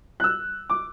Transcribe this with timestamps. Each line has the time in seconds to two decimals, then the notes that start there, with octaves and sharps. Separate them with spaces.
0.20 F#6
0.24 E6
0.70 D6